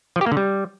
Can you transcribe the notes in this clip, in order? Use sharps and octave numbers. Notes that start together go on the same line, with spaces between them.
F3
G4
A#3
D3
G3